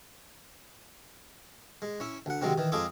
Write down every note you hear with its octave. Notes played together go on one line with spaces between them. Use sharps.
G#3
C#4 E4
D2 F#5
C3 D#3 F#3 G#3 C4
D#3 E3
F2 G#3 F4 G#4 A4 D6